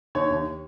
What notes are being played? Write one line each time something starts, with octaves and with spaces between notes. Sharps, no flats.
D#2 C#5
D#2